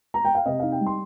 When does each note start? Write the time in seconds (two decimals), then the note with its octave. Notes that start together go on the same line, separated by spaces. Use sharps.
0.14 A#5
0.25 G5
0.35 F5
0.46 C3 D#5
0.60 D#4 F5
0.72 G5
0.81 G3
0.86 C6